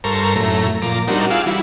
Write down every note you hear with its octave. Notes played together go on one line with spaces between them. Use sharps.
G2 A4 A#4 C5 A#5 C#6
F#2 A2 A3 A#5
A#2 F3 A#5 D6
G3 C4 D4 D#4 F#4 A#4
F4 G#4 F5 F#5 D6 E6
E3 G3 E4 F#4